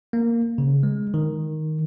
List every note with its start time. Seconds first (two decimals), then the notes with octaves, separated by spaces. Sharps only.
0.13 A#3
0.58 C#3
0.83 G#3
1.14 D#3